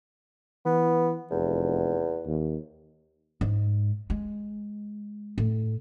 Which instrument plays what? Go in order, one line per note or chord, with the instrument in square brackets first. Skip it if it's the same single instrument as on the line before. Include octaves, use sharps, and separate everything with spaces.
[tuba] E3 [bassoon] B3
[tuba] F1 [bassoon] E2
[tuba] D#2
[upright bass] G#2
G#3
A2